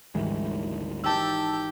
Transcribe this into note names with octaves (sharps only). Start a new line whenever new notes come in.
G#1 D2 E3 G3 G#3
D#4 G4 C5 A5 E6 G6